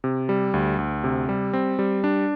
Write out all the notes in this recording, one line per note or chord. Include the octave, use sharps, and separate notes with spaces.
C3
G3
D2
D2
C3
G3
C4
G3
D4